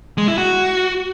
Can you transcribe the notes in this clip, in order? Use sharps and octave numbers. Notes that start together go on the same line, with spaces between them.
G#3
E4
F#4